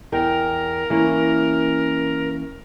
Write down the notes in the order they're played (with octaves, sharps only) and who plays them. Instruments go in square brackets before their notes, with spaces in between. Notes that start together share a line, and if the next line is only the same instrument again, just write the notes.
[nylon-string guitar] E2 G5 [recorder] A#4
[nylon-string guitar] E3 A#3 C#4